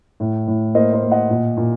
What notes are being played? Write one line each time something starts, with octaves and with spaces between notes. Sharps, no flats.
A2
A2
A#3 C5 D#5
C5 D#5
A#3
D#5 F#5
A#2
A#2